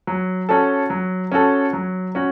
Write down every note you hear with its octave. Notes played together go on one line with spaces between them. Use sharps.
F#3
C#4 F#4 A4
F#3
C#4 F#4 A4
F#3
C#4 F#4